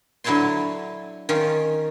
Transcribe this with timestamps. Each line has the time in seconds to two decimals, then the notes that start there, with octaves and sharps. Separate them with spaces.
0.24 D3 F#3 E4 G#5 A5 C6
1.29 D#3 C#4 F4